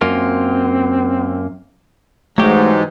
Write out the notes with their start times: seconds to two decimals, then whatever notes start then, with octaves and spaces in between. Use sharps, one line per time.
0.01 F#2 A#3 C4 F4
2.38 G#2 E3 F#3 A3 G4